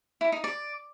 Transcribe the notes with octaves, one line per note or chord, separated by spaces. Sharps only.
E4
D#4
D5